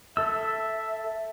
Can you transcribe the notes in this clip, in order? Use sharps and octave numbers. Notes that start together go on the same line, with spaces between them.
A4 E5 E6